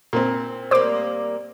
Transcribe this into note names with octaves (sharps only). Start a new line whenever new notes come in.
A#2 C4
G3 A#3 C5 D6